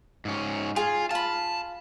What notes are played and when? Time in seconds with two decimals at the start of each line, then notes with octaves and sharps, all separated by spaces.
0.25 G#2 C#4
0.76 F4 G#4 G#5
1.11 F4 A5 B5